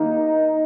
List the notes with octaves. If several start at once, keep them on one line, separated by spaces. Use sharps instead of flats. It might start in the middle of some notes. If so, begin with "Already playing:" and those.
Already playing: D#2 D#3 A#3 D#4